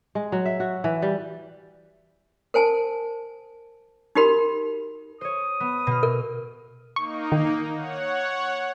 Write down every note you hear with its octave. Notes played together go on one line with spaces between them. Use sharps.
G#3
F#3
E5
F#4
E3
G3
A#4 C5 G#5 A5
D#4 F#4 G4 A#4 B5
C5 C#5 D#6
B3
B2 F6
A#4
A#3 D#4 C#6
D#3
C#5 F#5